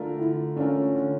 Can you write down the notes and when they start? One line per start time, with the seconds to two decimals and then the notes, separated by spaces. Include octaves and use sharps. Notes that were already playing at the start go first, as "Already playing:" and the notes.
Already playing: D3 A3 D4 F4 A#4
0.18 D3 E4
0.56 A3 C#4 D4 F4 A#4
0.95 D3